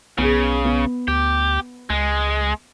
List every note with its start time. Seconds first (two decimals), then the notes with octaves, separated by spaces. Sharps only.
0.18 B1 C#3 B3 G#4
0.65 B3
1.08 D2 G4
1.90 C#2 G#3